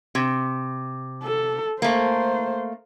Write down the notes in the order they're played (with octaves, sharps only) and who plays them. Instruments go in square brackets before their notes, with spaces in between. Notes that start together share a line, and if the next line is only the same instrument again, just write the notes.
[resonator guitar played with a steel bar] C3
[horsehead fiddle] A4
[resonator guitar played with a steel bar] A3 A#3 [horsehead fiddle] C5